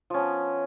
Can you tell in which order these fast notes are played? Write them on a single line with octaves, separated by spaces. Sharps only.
F3 C#4 B3